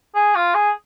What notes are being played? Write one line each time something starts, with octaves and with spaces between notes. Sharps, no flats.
G#4
F4
G#4